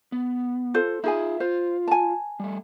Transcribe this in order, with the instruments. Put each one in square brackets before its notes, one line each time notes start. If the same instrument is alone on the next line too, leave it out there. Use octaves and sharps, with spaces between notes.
[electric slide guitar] B3
[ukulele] F4 A4 C5
[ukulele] D#4 G#4 G#5 [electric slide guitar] F4 E5
[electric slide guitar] F4 [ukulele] C5
[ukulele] G#5 A5
[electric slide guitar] G3 A3